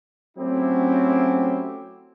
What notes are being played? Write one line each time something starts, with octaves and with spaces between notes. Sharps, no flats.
F#3 A3 C4 C#4 E4 G4